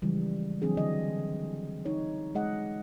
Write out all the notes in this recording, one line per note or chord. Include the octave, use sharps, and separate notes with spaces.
C#3 E3 F3 G3 G#3
E3 F#3 C4 D4 G#4
D3 D#5
D#4 C#5
G#3 G#4 D#5 F#5